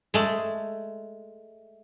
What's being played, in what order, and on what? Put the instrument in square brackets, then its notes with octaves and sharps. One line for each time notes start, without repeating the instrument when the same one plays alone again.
[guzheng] G#3 A3